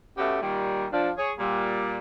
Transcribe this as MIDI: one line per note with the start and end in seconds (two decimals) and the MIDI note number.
0.18 0.39 47
0.18 0.39 57
0.18 0.39 61
0.18 0.39 67
0.41 0.85 46
0.41 0.85 51
0.41 0.85 55
0.92 1.09 53
0.92 1.09 62
1.17 1.32 68
1.17 1.32 73
1.38 1.98 46
1.38 1.98 55